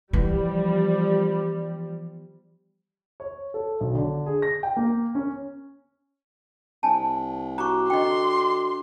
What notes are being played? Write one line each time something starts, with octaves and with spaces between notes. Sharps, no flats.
E3 F3 G3 B3
C#5
A4
B1
D3
G#4
A#6
G5
A#3
C#4
C2 G#5 A5
F#4 A#5 C#6 D6
D3 D#5 G5 C6